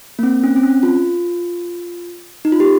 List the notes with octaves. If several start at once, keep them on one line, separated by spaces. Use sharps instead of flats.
A#3
C4
C#4
C4
C#4
F4
D#4
F4
G4